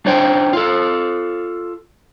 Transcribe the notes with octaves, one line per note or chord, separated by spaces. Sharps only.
D4 D#4 C5 C#5 G5
F4 A4